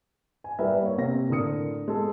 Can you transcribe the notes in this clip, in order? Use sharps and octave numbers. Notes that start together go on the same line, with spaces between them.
G#5
G3 E4 A#4 B4 E5
A#3 C#5
C3 A#3 A#6
A2 D3 A#4 D#6 C#7
G#3 A4